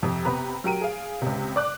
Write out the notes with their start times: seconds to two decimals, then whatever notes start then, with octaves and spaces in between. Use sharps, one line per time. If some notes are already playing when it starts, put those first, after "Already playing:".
0.03 F2 C3
0.24 C3 B3 B4 A#5 B5
0.64 F#3 G4 A#4 D7 D#7
0.81 G#4 F5
1.22 C#2 C3
1.56 D5 D6 F#6